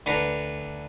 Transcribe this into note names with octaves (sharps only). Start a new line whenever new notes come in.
D2 D4 B4 A#5 C#6